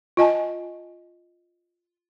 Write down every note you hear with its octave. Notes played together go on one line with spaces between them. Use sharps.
F4 D#5 G#5 A5